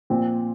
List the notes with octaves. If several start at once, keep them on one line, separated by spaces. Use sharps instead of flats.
A#2 F3 C4